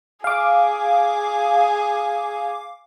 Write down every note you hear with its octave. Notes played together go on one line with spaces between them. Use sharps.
G#4 F5 D6